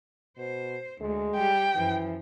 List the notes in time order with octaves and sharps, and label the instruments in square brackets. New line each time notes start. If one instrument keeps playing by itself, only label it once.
[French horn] B2 [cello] C5
[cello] D2 [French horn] G#3
[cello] G3 G4 [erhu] G5
[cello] F#2 F3 [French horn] E3